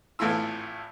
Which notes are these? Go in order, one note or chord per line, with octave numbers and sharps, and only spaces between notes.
G#1 A2 E3 A3 F4 E6